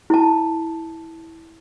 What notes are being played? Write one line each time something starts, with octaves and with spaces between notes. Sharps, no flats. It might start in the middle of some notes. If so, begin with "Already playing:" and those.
E4 A5